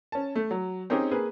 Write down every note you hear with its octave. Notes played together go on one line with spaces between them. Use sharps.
C#4 A5
A3
F#3
C4 C#4 D#4 G4 G#4
A#3 G#4 B4